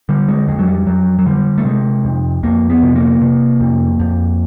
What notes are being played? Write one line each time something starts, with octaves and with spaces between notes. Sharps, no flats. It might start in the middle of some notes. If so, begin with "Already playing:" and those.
D3 G3
G#3
F2 G#3
F#3
G3
F2 F#3
F#3
D3 G3
A3
C3 G#3
F2
F2 A#3
B3
C3
A#3
C3
F2
F2